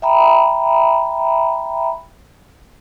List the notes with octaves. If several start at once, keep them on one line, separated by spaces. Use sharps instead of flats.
E5 G5 A#5 B5